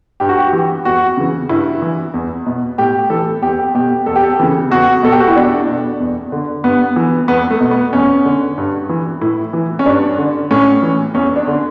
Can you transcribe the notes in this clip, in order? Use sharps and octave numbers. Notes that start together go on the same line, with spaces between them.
G2 G4
F#4
G4
E3
E2 F#4
C#3 E3
G2 E4
E3
E2
B2
A2 G4
E3 A4
E2 G4
B2 G4
E2 A4
G4
A4
C#3 E3
E2 F#4
B2 A4
G4
F#4
E4
E2 D4
B2
E2
D3
G2 B3
E3
E2 B3
A3
B2
B3
E2 C#4
D3
G2
E3
A2 E4
E3
C#4
G2 D4
D3
A2 C#4
E3
E2 C#4
D4
D3